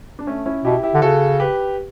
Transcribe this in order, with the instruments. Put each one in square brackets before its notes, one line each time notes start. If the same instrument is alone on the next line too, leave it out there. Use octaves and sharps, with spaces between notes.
[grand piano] D4
A3 C#4
C#4 E4
[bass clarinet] B2 [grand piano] E4 G4
[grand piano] E4 G4
[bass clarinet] D3
[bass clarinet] C#3 [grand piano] F#4 A4
[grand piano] G4 B4